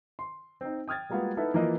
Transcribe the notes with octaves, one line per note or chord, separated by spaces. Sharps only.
C6
C4 D#4
G5 D#6 F6 G#6 A6
G3 G#3 A#3 B3 F4 F#4
B3 D#4 E4 A4 B4 E5
E3 F3 A#3 A#4 D#5